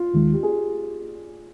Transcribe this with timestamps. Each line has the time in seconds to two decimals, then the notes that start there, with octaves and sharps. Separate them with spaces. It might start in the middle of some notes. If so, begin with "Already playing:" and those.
Already playing: F4
0.14 D#2 D#3 G#3
0.33 G4
0.43 G#4